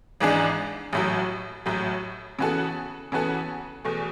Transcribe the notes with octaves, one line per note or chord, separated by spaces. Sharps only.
G#1 G#2 E3 G#3 D4
A1 A2 F#3
A1 A2 F#3
C#3 E3 B3 F#4 A4
C#3 E3 B3 F#4 A4
E2 B2 A3